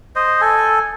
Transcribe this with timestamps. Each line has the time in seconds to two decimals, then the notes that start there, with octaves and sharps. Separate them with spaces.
0.16 C5 D#5
0.41 A4 G#5